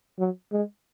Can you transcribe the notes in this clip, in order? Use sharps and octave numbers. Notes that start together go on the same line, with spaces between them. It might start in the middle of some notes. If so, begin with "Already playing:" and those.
F#3
G#3